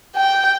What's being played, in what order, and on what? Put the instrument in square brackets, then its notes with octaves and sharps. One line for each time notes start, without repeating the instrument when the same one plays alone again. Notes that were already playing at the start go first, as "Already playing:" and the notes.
[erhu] G5